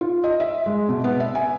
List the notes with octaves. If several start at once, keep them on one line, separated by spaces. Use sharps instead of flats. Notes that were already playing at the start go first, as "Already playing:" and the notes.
F4
D#5
E5
G#3
B2
B3
E5
G#5